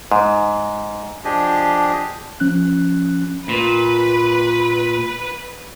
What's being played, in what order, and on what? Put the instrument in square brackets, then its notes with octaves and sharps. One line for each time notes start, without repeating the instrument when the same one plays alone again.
[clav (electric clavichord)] G#2
[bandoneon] F3 D4 G4 G#4 D#5
[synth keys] F3 C#4 F#6
[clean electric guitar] A#2 [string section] B4